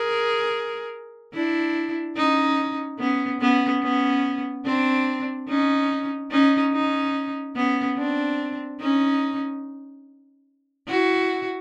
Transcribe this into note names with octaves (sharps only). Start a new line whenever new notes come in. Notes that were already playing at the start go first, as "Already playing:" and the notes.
Already playing: G#4 A#4
D4 E4
C#4 D#4
B3 C#4
B3 C#4
B3 C#4
C4 D4
C#4 D#4
C#4 D#4
C#4 D#4
B3 C#4
C4 D4
C#4 D#4
E4 F#4